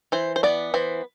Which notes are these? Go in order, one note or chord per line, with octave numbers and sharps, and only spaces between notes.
E3 C5
C5
B3 D5
E3 C5